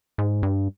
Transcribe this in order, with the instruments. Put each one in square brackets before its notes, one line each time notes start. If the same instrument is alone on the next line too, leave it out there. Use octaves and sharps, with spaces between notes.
[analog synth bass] G#2
G2